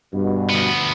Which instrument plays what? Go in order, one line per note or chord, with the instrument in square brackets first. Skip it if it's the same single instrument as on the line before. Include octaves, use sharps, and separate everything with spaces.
[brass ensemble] G2 B2
[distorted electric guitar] D2 B3